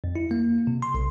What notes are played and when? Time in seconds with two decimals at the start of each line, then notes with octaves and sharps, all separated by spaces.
0.04 F2
0.16 E4
0.31 A#3
0.67 C3
0.82 C6
0.94 B1